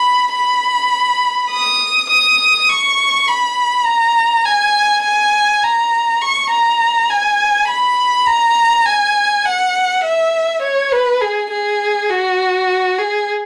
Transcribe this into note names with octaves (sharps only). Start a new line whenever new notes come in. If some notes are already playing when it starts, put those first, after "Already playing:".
Already playing: B5
B5
D#6
D#6
C#6
B5
A#5
G#5
G#5
A#5
C#6
A#5
G#5
B5
A#5
G#5
F#5
E5
C#5
B4
G#4
G#4
F#4
G#4